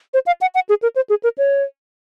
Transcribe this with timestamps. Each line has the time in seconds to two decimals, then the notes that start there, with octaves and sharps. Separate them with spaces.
0.14 C5
0.26 F5
0.41 F#5
0.54 F#5
0.69 G#4
0.82 A#4
0.96 C5
1.10 G#4
1.23 A#4
1.38 C#5